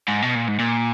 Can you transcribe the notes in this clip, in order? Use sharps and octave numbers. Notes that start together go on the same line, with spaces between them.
G#2
B2
A#2
G#2
A#2